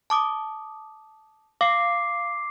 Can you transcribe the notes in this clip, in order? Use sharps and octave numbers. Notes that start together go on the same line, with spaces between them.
A5 D6 D#6
F5 D6 C7